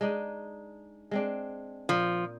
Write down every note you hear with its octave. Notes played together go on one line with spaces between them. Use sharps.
G#3 D4 D#4
G#3 C4 D4
A#2 F3